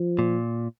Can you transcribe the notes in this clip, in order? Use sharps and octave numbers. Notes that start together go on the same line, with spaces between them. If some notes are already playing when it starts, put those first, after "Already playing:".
Already playing: F3
A#2